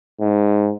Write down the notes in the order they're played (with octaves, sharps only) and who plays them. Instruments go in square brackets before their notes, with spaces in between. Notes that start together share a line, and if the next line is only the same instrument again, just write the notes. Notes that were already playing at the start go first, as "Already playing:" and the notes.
[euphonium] G#2